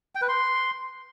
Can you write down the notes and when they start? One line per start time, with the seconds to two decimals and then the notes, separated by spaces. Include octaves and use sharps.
0.15 G5
0.22 B4
0.28 C6